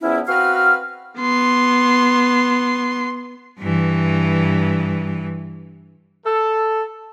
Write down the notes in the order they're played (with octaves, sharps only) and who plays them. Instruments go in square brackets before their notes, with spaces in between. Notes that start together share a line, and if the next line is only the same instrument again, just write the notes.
[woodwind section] E2 F3 B3 C#4 E4
C4 F#4 B4 F5 F6
[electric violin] B3 C6
[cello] G2 E3
[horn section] A4